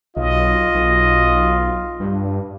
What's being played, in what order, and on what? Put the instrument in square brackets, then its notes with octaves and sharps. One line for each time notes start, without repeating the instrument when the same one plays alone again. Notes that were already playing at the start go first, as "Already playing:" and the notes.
[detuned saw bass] B1 [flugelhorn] F4 [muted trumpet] D#5
[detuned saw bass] B1
G2